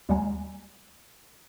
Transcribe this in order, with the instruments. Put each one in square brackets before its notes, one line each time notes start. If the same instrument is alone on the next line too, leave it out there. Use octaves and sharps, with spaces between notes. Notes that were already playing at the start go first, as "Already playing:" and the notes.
[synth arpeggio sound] D#2 G3 G#3 F#5 G#5 A#5